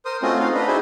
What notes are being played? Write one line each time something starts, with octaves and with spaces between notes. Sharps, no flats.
A#4 C5 C6 D#6
A3 C4 C#4 F4 F#4 D#5
D#4 F4 F#4 F5
D4 B4 D#5
D#4 E4 F#4 G#4 C5